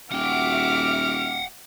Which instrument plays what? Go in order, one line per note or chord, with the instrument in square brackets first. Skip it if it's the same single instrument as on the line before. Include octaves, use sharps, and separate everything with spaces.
[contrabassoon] D#1 [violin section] F#4 E5 D6 [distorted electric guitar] F#5 G5 [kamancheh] F6